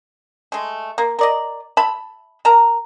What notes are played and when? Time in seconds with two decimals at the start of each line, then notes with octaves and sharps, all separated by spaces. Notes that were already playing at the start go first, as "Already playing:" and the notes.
0.52 G#3 A3
0.98 A#3
1.19 A#4 D5 D#5
1.77 E5 A5 B5
2.45 A#4 A5 A#5